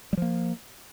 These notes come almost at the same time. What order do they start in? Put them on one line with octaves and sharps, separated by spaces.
G3 F3 A#3